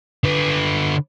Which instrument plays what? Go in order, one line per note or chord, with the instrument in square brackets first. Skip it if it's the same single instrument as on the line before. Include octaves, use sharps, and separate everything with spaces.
[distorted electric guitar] D3 B4